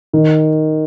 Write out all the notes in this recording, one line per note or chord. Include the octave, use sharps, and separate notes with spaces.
D#3